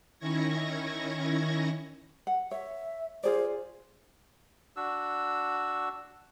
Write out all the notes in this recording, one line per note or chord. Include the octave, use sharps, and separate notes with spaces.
D#3 C#4 E4 C#6 G#6 A#6
F#5
C#5 E5
F4 G#4 C5 D5
D4 F#4 E6